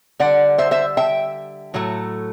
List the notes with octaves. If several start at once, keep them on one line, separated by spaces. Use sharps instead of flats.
D3 G3 D5 F#5
C5 E5
C5 E5
E5 G5
A2 F#3 A3